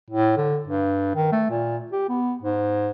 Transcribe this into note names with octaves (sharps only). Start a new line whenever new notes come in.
A2
D3
G2
D#3
A3
A#2
G4
B3
G#2